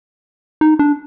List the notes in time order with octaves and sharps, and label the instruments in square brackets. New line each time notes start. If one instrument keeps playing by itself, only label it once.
[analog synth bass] D#4
D4